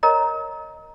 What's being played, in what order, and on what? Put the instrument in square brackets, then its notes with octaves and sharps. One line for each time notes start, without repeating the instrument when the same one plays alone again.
[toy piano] A#4 C#5 D#5 A#5